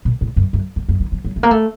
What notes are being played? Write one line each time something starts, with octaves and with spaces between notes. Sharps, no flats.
A#2
A2
F#2
F#2
F#2
F#2
D#3
F3
F#3
A3
A#3
A3